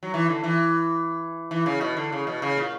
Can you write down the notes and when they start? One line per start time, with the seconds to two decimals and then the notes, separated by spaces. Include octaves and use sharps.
0.03 F#3
0.14 E3
0.29 D3
0.44 E3
1.51 E3
1.66 C#3
1.81 B2
1.97 D3
2.12 C#3
2.27 B2
2.42 C#3
2.57 A#2